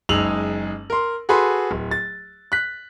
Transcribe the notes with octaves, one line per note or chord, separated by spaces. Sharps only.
F#1 G#3 D#4 E6 F7 F#7
A#4 C6
F#4 G#4 A4 B4 B5 C6
D1
A6
F#6 B6